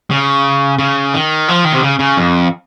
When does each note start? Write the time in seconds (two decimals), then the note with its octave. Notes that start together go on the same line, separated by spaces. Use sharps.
0.11 C#3
0.79 C#3
1.14 D#3
1.48 F3
1.65 D#3
1.74 C3
1.83 C#3
1.99 C#3
2.17 F2